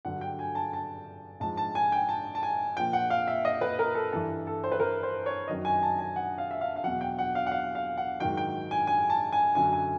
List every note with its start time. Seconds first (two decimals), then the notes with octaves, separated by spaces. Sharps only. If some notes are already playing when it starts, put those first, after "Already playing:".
0.05 G2 D3 F#3 F#5
0.21 G5
0.39 G#5
0.55 A5
0.73 A5
1.40 G#2 F3 A5
1.57 A5
1.75 G#5
1.92 G5
2.09 A5
2.35 A5
2.43 G#5
2.76 A#2 F3 G5
2.93 F#5
3.10 F5
3.28 E5
3.45 D#5
3.61 B4
3.79 A#4
3.95 A4
4.13 G2 E3 A4
4.47 A4
4.64 C5
4.72 B4
4.80 A#4
5.03 C5
5.26 C#5
5.48 F#2 D#3 F#3 D#5
5.65 G#5
5.83 A5
5.99 G#5
6.16 F#5
6.38 F5
6.51 E5
6.61 F5
6.76 F5
6.83 E2 B2 F#3 F#5
7.01 G5
7.19 F#5
7.35 F5
7.47 F#5
7.51 F5
7.75 F5
7.97 F#5
8.20 G#2 D#3 F#3 G5
8.37 G5
8.71 G#5
8.87 G#5
9.10 A5
9.32 G#5
9.55 F#2 D3 F#3 G#5
9.73 G#5